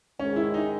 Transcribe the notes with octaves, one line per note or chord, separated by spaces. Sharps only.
G#2 D#3 G#3 C#4
E4
D#4